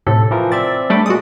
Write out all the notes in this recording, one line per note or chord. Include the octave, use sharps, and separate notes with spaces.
A2 C3 A4
E3 F3 A#4
C4 D5 E5 A6
G3 A3 D4 A4 B5 D6
A#2 G#3 F#4 D#6